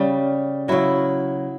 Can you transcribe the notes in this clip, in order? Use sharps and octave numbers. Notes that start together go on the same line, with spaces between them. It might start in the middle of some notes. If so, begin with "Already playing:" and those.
Already playing: C#3 G3
C#3 F#3 E4